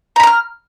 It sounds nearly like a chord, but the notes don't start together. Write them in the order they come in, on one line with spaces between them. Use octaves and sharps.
A#5 B5 D6 F6